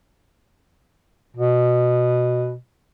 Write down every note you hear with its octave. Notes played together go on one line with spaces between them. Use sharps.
B2